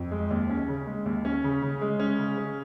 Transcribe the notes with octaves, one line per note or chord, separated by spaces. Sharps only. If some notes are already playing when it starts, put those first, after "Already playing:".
Already playing: F2
G#3
D#2
C#4
C#3
G#3
D#2
C#4
C#3
C#3
G#3
C#4
C#3
C#4